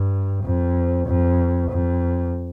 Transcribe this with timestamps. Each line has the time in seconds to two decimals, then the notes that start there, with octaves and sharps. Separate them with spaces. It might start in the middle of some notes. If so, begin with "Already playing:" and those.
Already playing: G2
0.44 F2
1.07 F2
1.70 F2